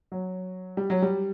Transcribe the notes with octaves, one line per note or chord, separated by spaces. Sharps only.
F#3
G3
F#3
G3